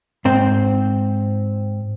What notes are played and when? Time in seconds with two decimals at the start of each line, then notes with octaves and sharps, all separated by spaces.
0.25 G#2 C4